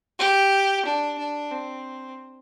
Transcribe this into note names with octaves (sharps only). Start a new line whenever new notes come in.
G4
D4
D4
C4